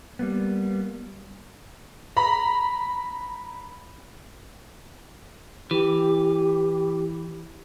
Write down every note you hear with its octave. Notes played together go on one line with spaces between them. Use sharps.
G3 A#3 B3
A#5 B5
E3 G4